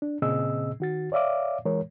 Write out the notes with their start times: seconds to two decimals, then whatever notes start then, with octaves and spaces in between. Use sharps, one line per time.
0.02 D4
0.22 A#2 C#3 C4 G#4 D#5 E6
0.80 D#3 F#4 A6
1.12 C#5 D5 E5 F5 D6
1.65 E3 G#3 A#4 C#5